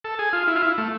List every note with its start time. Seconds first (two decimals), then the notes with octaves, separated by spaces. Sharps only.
0.04 A4
0.19 G#4
0.33 F4
0.48 E4
0.56 F4
0.62 E4
0.78 A3